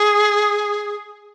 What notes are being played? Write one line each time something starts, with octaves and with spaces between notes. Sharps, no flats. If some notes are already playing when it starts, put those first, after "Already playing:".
Already playing: G#4